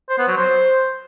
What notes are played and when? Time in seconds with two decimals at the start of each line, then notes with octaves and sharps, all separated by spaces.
0.09 C5
0.19 B3
0.28 F#3
0.37 C5